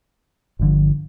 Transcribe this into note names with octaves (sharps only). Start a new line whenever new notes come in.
G1 G2 D3 F3